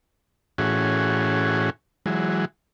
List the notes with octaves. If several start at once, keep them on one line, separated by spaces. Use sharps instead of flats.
A2 E3 C#4 F#4 G#4
E3 F#3 G#3